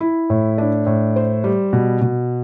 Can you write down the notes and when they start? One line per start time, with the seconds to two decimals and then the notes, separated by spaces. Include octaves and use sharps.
0.01 E4
0.30 A2
0.58 D4
0.86 A2
1.16 C5
1.44 G3
1.73 B2
2.01 B2